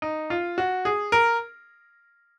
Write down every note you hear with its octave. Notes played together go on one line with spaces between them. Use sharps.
D#4
F4
F#4
G#4
A#4